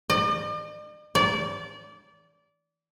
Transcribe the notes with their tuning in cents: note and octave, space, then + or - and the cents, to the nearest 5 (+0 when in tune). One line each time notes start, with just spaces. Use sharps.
D5 +45
D5 -25